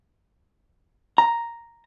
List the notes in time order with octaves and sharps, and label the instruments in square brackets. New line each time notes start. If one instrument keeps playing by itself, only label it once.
[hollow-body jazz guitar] A#5